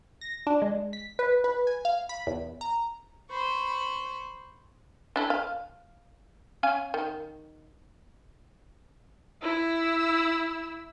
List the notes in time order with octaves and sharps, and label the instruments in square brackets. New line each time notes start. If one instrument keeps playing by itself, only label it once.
[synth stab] A#6
D4
G#3
B6
B4
B4
G#5
F5
B5
E2
A#5
[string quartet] C5 B5 C#6
[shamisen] D4 E4 A4
F5
C#4 F5 G#5
D#3
[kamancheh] E4 E6